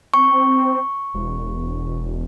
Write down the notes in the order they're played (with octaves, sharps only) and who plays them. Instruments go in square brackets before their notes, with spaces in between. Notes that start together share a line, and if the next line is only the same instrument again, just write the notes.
[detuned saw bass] C4 [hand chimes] C#6
[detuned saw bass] E1